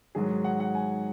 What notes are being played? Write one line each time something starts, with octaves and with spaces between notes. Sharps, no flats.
G#2 D#3 F#3 G#4
F#5
F#5
G#5